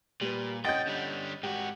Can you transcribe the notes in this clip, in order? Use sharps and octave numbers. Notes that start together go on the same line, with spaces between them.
A#2 G3 B4
F2 C#4 D#5 F#5 G5 G6 A6
D3 G3
G#2 F#4 G4